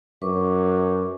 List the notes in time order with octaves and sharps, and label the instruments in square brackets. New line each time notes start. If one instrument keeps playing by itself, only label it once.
[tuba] F#2 [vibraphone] B4 C#6 D6